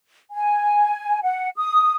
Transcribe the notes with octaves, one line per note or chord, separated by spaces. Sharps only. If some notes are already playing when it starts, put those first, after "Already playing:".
G#5
F#5
D#6